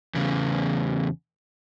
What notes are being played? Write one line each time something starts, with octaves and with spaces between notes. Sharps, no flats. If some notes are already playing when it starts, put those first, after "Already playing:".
E2 C#3